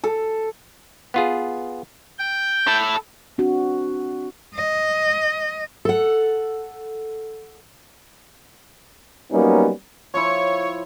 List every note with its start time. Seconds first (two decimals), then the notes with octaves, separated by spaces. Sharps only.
0.04 A4
1.14 B3 F4 G#4
2.19 G5
2.67 E4 A4
3.38 C4 D4 F#4
4.54 D#5
5.85 A4 F#5
9.32 F#3 G3 A#3 B3 C#4 D#4
10.14 F3 E4 C#5 C#6